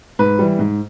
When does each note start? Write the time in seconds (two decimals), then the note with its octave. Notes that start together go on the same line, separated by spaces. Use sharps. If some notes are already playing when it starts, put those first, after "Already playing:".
0.19 G#2 B4
0.39 E3 G3
0.59 G#2